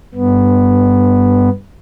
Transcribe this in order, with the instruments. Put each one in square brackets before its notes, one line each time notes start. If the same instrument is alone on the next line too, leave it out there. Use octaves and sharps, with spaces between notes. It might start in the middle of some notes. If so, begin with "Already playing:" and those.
[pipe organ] G2 B3